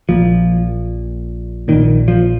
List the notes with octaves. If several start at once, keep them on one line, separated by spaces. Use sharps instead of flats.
A#1 A#2 F3
A#1 A#2 D#3
F3